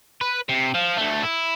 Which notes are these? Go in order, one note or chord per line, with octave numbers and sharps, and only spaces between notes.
B4
C3
F3
D2 A3
E4